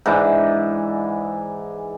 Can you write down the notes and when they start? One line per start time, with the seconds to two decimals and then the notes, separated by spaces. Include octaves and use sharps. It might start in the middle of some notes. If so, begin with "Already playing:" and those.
0.06 G#2 E3 D4